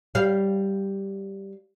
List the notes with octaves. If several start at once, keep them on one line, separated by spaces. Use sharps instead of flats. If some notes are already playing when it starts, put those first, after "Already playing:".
G3 F5